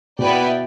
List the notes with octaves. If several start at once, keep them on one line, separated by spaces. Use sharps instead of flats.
B2 B3 E4 B4 D5 G5